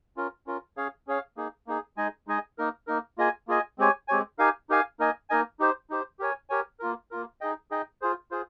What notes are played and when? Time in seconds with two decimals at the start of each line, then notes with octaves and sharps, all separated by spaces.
0.17 C#4 F4 A#4
0.47 C#4 F4 A#4
0.77 C#4 G#4 C#5 F5
1.07 C#4 G#4 C#5 F5
1.37 A#3 D#4 G#4
1.67 A#3 D#4 G#4
1.97 G#3 D#4 G#4 D#5 G#5
2.27 G#3 D#4 G#4 D#5 G#5
2.58 A#3 D#4 A#4
2.87 A#3 D#4 A#4
3.18 A#3 F4 G#4 D#5 G#5
3.48 A#3 F4 G#4 D#5 G#5
3.78 G#3 C4 G4 C#5 G#5
4.08 G#3 C4 G4 C#5 G#5
4.39 D#4 G4 A#4 F5 G#5
4.69 D#4 G4 A#4 F5 G#5
4.99 A#3 D#4 A#4 D#5 G#5
5.30 A#3 D#4 A#4 D#5 G#5
5.59 D#4 G4 C5
5.90 D#4 G4 C5
6.19 G4 A#4 C#5 G#5
6.49 G4 A#4 C#5 G#5
6.80 A#3 F4 A#4
7.11 A#3 F4 A#4
7.41 D#4 G#4 D#5 G5
7.71 D#4 G#4 D#5 G5
8.02 F4 G#4 C5
8.31 F4 G#4 C5